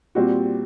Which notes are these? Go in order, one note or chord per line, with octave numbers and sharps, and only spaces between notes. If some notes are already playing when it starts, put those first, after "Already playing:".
A#2 G3 C4 F#4